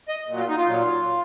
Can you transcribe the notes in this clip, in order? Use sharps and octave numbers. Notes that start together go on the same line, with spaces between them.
D#5
A#2 F#3
F4
D#4
F4
A#2 F#3